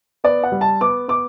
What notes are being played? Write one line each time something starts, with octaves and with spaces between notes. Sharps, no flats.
B3 D5
F#5
G3
A5
B3 D6
B3 D6